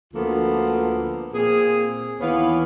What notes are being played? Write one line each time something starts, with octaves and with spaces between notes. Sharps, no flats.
D2 F3 A#3 B3 F4 A4
A#2 A#3 C4 G#4
D#2 E3 B3 B4 C#5 F5